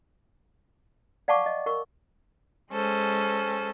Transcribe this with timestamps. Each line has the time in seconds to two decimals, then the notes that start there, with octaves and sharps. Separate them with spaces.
1.28 D5 F5 F#5 A5 C#6 D6
1.46 D#5
1.66 A#4 C#6
2.72 G#3 C#4 A4 C5